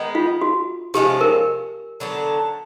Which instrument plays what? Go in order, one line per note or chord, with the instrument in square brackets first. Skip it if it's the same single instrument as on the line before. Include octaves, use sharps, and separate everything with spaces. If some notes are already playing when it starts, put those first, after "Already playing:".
Already playing: [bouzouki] D#3 G#3 B3
[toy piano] F4
F#4
[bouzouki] C3 F3 G#3 C#4 [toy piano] G4
[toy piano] A#4
[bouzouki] D3 F#3 B3 D4